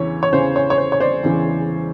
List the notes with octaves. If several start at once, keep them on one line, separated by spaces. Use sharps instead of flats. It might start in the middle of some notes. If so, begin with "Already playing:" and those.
Already playing: E2 C#3 E3 C#5
C#5
E2 C#3 E3 C5
C#5
C#5
C5
C#5
C5 D5
E2 C#3 E3